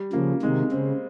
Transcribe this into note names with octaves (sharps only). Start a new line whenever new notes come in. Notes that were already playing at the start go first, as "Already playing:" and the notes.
Already playing: G3
C#3 F3 A#3
C3 D#3 G#3
C#3 C4